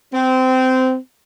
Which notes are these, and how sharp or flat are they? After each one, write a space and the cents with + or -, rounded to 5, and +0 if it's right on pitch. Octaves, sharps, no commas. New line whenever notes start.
C4 -20